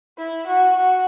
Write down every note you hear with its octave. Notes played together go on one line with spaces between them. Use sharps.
E4
F#4
F#4